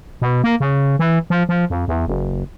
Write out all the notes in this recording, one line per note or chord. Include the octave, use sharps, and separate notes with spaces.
B2
A#3
C#3
E3
F3
F3
F2
E2
F#1